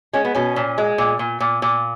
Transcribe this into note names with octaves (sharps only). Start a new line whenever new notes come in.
G#3 C#4
B3
B2 C#4
A#2
G#3
A#2
A#2
A#2
A#2